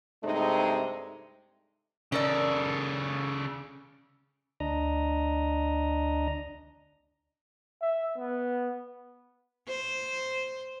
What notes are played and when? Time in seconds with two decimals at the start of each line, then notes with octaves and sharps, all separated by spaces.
0.23 G2 C3 G#3 A3 C4 D#4
2.12 C#3 C#4 A4 A#4 D5
4.60 D2 D4 D#5 A#5
7.81 E5
8.18 B3
9.68 C5